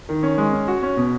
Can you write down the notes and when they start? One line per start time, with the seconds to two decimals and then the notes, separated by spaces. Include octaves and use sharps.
0.09 D#3
0.23 C#4
0.38 G#3
0.53 C#4
0.68 F#4
0.83 C#4
0.97 B2